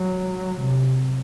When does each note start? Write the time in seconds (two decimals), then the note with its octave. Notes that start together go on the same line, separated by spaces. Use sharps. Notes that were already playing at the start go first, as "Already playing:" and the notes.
Already playing: F#3
0.61 C3